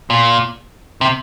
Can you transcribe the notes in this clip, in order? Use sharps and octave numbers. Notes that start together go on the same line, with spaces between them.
A#2
C3